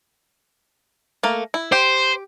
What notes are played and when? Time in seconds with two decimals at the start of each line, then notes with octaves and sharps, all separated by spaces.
1.23 A3 A#3
1.54 E4
1.72 G4 C5